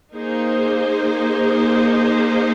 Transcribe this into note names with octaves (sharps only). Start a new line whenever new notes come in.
A#3 D#4 G#4 C5